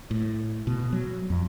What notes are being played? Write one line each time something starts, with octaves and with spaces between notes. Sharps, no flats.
A2
B2
F#3
F2